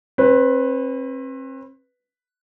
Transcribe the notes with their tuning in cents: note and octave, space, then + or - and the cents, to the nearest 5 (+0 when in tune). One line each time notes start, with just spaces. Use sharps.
C4 +40 B4 +0